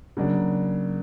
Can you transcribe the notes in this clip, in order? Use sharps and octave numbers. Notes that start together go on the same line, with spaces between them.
C#3 F#3 A#3 D4